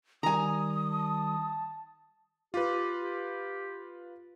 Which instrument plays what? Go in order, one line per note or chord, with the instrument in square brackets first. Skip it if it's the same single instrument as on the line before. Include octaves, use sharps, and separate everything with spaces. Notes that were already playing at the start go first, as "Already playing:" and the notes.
[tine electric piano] D#3 G3 [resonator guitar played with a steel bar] G#5 A#5 [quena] D#6
[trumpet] A5
[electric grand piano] F4 B4 [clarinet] G4
[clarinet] G4